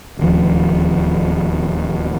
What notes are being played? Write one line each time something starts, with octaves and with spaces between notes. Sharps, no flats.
D1 D#2 F3